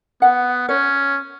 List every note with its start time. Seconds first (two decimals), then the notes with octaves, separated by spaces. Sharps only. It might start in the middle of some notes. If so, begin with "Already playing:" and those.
0.22 B3 F#5
0.69 C#4 C#5